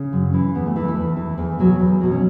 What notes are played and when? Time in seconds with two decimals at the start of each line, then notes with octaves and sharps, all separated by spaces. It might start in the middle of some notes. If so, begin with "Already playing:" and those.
Already playing: C#3 C#4
0.13 F#2
0.33 E3
0.55 E2 B3
0.66 A3
0.76 E3
0.88 A3
0.97 E2
1.17 E3
1.38 E2
1.59 B2 F#3
1.79 E2
2.01 B2 F#3
2.12 C#4